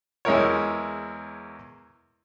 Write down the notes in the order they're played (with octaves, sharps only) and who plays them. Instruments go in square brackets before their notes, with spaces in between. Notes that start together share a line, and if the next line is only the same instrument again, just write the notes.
[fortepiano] E2 G#3 E4 A#4 C#5